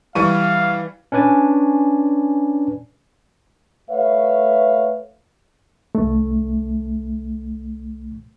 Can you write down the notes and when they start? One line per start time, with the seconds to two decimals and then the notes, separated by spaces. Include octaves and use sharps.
0.15 E3 G3 F5 C#6 D#7
1.12 C#4 D4 B4 D5 G#5
3.90 A3 B4 C#5 E5 F5
5.95 C2 A3